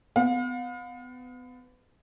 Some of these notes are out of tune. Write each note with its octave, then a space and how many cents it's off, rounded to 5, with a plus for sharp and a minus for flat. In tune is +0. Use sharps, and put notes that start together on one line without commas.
B3 +30 F5 +40